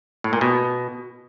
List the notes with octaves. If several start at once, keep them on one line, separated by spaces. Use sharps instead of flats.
A2
A#2
B2